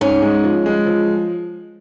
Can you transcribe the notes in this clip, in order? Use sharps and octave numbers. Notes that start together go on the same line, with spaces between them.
G#2 C#4
G#3
F3
G#3
F3